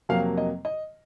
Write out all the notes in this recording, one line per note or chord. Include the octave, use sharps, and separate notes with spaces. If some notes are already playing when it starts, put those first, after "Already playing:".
F2 C3 F#3 A#3 F5
D#5
D#5